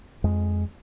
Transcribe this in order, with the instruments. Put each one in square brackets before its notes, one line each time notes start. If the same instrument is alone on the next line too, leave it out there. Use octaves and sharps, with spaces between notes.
[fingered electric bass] F2 G#3